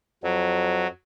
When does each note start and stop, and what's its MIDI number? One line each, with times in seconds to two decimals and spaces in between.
0.24 0.87 41
0.24 0.87 54